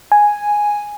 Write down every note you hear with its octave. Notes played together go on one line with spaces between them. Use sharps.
G#5